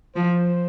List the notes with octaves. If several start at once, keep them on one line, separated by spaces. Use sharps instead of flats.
F3 C5